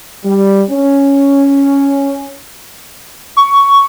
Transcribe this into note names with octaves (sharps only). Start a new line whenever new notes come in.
G3
C#4
C#6